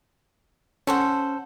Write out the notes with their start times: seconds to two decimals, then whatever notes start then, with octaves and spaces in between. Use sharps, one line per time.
0.87 C#4 A4 C5 F#5